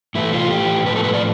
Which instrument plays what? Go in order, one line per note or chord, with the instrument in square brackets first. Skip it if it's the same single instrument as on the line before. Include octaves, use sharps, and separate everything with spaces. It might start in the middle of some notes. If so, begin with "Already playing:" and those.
[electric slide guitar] A2 E3 A3 E4
F4
G4
A2 F3 A3 B4
A4
B4
D5